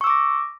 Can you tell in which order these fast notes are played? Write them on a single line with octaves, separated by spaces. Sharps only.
C#6 E6 D6 A#6